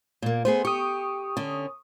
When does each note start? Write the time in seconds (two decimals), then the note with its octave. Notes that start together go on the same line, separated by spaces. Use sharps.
0.22 A#2 A#3
0.45 A3 B3 G#4 C5
0.65 G4 C#6 D#6
1.37 D3 C#4